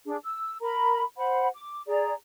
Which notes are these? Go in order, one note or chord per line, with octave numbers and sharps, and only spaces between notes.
D4 G#4
E6
A#4 A#5 B5
C5 F#5 B5
D6
G#4 D5 A#5